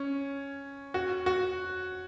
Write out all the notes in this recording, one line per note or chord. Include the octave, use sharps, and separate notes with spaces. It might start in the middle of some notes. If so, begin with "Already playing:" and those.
Already playing: C#4
F#4
F#4